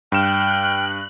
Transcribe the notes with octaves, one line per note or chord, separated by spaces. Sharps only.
G2 G5 F6 F#6 E7